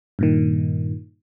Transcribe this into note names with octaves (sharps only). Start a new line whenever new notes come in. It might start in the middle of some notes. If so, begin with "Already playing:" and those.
G2 A#2 D#3